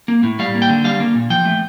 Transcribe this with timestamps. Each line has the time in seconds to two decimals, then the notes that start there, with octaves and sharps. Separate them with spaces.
0.08 A#3
0.23 A2
0.39 G3 F5
0.55 A#3
0.62 G5
0.69 D3
0.84 G3 F5
1.00 A#3
1.15 A#2
1.30 F3 G5
1.45 A3